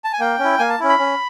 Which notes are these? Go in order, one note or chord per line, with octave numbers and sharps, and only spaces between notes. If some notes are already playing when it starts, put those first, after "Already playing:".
A5
G#5
A#3 G5
C#4 E4
A#3 G#5
A5
C#4 E4
B5
C#4